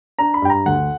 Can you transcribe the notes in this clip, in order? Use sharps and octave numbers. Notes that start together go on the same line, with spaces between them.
D4 A#5
B5
G2 G5
A#5
D2 F#5